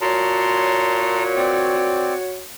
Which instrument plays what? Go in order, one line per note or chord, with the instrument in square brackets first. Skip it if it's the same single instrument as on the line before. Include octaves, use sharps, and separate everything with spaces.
[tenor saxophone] A#2 [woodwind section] F#4 C#5 [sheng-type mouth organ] A5 A#5 C6
[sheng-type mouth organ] C4 D5